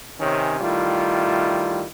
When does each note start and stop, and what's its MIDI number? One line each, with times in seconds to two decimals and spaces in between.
0.20 0.59 48
0.20 0.59 51
0.20 0.59 61
0.61 1.84 51
0.61 1.84 55
0.61 1.84 57
0.61 1.84 64
0.61 1.84 65